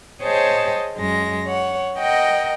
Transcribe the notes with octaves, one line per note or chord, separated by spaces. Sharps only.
G#4 C5 C#5 D#5 G5 A5
F#2 G#3 A#6
C#5 F#5
A#4 D#5 F#5 G5